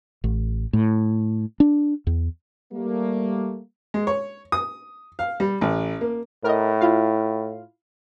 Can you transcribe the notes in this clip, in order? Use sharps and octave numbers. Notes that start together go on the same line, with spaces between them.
A1
A2
D4
E2
G3 A3 A#3
G#3
C#5
D#6
F5
G3
A1
A#3
A2 A#4 D#5
E4 F4 F5